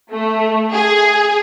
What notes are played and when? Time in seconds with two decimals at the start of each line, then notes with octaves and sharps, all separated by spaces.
0.11 A3
0.74 G#4